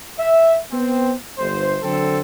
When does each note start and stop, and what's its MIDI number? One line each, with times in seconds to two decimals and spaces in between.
0.19 0.56 76
0.72 1.13 59
0.72 1.13 60
1.38 1.77 31
1.38 1.77 72
1.82 2.20 50
1.82 2.20 54
1.82 2.20 60
1.82 2.20 69